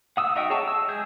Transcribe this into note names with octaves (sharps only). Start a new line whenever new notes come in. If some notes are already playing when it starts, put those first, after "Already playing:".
F#5 D#6 E6
D#4 F#4 D#5 E5 G5
G#4 C#5 G5 A5 C#6
E6
G#3 G#4 G6